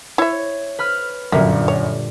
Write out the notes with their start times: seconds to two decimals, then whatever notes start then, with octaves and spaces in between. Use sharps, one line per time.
0.18 E4 C#5 E5
0.78 B4 B5 F6
1.32 G1 F#2 A#2 D3 G3 A#3
1.68 C#5